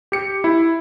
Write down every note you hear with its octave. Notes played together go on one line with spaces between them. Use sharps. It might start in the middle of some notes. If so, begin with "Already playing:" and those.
G4 C#7
E4